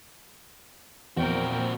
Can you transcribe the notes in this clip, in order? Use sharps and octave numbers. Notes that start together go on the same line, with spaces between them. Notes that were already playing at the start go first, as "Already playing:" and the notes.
E2 A#2 F3 C4 F#4 A#4 G5